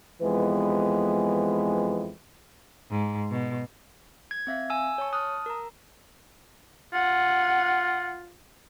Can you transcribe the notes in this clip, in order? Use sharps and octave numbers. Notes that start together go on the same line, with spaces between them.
F2 E3 G#3 B3 B4
G#2
B2
G#6
C4 E5 F5
G#5 E6
C#5 A5 C#6
A5 D#6 F6 F#6
A#4 A#5
F4 F#5